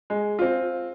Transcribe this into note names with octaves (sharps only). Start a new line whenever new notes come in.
G#3
C4 F4